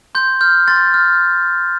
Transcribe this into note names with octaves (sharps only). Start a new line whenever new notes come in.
C6 G6
F6 G6
C6 A6
F6